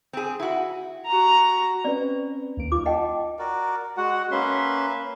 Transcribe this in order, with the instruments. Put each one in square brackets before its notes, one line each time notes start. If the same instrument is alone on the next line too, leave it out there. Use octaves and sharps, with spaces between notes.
[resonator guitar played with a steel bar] C4 G#4
E4 F#4
[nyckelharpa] F#4 A#5
[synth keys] C4 C#4 B4 [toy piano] D5
[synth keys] D#2 A#3 D7
[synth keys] D#4 F4 [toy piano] D6
[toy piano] D#5 F#5 G5 [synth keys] A5
[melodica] F#4 A#4 D5
[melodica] G#3 [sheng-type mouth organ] F#4 F#5
[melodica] A#3 B4 E5 [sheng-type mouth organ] C#4 C6